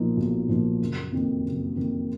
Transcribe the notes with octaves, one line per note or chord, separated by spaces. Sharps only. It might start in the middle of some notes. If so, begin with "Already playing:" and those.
Already playing: B1 A#2 F3 A#3 D#4
B1
A#2 F3 A#3 D#4
F#1
F2 D#3 A#3
F#1
F2 D#3 A#3